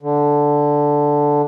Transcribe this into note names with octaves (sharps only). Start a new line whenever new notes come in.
D3